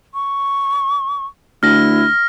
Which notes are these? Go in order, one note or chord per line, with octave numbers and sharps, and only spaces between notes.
C#6
D2 E4 F6 A#6